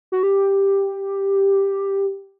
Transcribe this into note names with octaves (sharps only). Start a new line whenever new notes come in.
F#4
G4